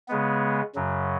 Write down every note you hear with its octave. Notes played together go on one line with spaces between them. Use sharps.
C#3 G#3 B3
F#2 C#3 F#3